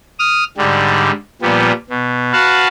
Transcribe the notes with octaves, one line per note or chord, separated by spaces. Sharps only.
D#6 F6
G#2 D3 G3
A#2 F3 G3 B3
B2
F#4 B4 F5 A5